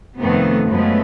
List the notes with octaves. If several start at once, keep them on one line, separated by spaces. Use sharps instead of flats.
F2 C3 D#3 A3 B3
F#2 C#3 F3 G#3 A3 B3